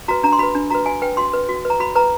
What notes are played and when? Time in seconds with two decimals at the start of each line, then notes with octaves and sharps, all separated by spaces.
0.08 F#4 B4 A#5
0.23 D4 A#5
0.33 C6
0.39 F#4 B4 B5
0.55 D4
0.70 F#4 B4 A#5
0.86 F#4 G#5
1.02 B4 G5
1.17 F#4 C6
1.33 B4
1.49 F#4
1.65 B4
1.70 A#5
1.80 F#4 B5
1.96 B4 A#5